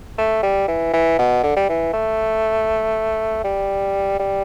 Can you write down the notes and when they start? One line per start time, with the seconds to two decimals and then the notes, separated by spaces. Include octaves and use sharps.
0.18 A3
0.43 G3
0.68 E3
0.93 E3
1.18 B2
1.43 D3
1.57 G3
1.69 E3
1.93 A3
3.44 G3
4.19 G3